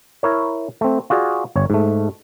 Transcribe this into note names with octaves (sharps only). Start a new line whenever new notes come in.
E4 A#4 C#5
A3 C4
F4 F#4 G#4 D5
G1 C#5
G#2 A3